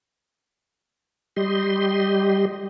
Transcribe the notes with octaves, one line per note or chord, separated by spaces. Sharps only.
G3 G4 D#5 C6